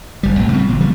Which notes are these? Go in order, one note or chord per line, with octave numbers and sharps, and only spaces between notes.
F#1 G3
B1 A2 C3 F#3
C#3 G3 B3 C4
G1 A#2 E3
C#3 E3 F3 G3